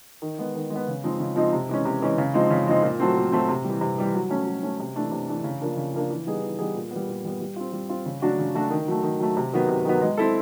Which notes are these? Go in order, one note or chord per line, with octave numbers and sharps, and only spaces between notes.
D#3
G#3 B3
D#3
G#3
B3
C#3
F3 G#3 C4 D#4
C#3
F3 G#3 C4 D#4
C3
E3 G#3 C#4
C3
E3 G#3 C#4
C#3
F3 G#3 C4 D#4
C#3
F3 G#3 C4 D#4
A#2
F#3 A3 C4
A#2
F#3 A3 C4
C3
G3
E3
C3
E3 G3
F#3
A3 C#4
F#3
A3 C#4
C3
E3 A3 D4
C3
E3 A3 D4
C#3
F3 A#3 D4
C#3
F3 A#3 D4
E3
G3 B3 D#4 G#4
E3
G3 B3 D#4 G#4
A#2
G3 B3
A#2
G3 B3
G3
C4 F4
G3
C4 F4
C#3
F#3 A3 D4 F#4
C#3
F#3 A3 D4 F#4
D#3
F#3 A3
D#3
F#3 A3
C3
D#3 F#3 B3
C3
D#3 F#3 B3
G#3
C4 E4 A4